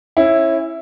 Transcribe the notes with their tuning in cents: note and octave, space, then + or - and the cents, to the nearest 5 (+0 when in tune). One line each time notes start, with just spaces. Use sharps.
C#4 -30 E4 +0